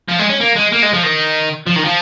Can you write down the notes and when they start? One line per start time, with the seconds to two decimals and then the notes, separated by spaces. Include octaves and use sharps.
0.09 F3
0.19 G#3
0.30 C#4
0.41 A#3
0.56 G#3
0.72 A#3
0.83 G#3
0.93 F3
1.04 D#3
1.67 F3
1.76 D#3
1.85 F3